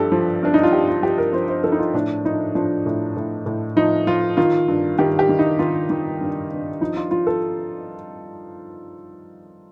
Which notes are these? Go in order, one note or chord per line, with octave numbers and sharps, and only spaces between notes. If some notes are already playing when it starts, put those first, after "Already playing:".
Already playing: G2 F3 G4 A4
F3
G2 D4
D#4
F4
G2 G4
F4
F3 G4
A#4
F3 C5
C5
F3 A4
D#4
F4
A2 D4
F3 D#4
F3 D4
A2
A2
A2
F3 D#4
F3 F4
D#3 F4
G2
D#3 G4
G4
D#3
D#4
D#3 F4
D#3
G2
G2
F3 D#4
F4
F3 F4
A4